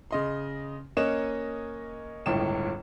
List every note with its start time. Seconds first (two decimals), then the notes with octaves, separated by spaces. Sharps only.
0.11 C#3 D#5 C6
0.97 A#3 C#4 C#5 D#5 F#6 E7
2.26 G1 C#2 A2 G5 E7